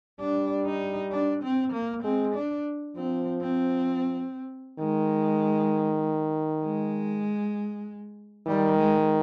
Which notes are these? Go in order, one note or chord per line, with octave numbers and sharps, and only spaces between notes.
G3 D4
D#4
D4
C4
A#3
G#3 C4
D4
F3 C4
C4
D#3 G#3
G#3
D#3 G3
G#3